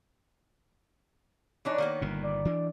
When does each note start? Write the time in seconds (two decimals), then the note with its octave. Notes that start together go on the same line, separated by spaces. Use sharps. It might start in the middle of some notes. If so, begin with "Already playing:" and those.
1.65 E3 D4 D#4 C#5
1.78 D#3 A#3 B3
2.02 G1 A#2
2.23 D5
2.45 E3 D4